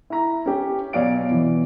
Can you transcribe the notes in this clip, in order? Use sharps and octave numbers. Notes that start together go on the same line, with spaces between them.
E4 A#5
C#4 G4
B1 C#5 D5 F5 D7
B2 E3